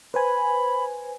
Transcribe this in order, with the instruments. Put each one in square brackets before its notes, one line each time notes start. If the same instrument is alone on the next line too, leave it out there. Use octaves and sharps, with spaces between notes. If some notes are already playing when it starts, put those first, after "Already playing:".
[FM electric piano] B4 C5 G#5 [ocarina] B5